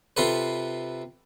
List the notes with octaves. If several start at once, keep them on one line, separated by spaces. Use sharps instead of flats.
C3 F4 A4 B4